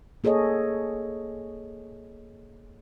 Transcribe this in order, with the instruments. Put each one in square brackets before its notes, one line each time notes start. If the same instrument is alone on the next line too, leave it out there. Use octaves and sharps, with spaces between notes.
[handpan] A#3 G#4 A4 C#5 D#5